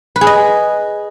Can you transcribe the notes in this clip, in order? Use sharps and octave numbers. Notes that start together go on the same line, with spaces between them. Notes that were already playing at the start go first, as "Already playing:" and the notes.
B4
G#4
D#5